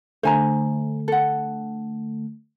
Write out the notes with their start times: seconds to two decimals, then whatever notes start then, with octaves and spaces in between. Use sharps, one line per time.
0.23 D3 A3 C5 G#5 A#5
1.08 A4 F#5